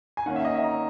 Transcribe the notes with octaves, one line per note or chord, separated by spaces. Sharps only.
G#5
D#3 A#3 C#4 F#5
E5
D#5
E5
A#5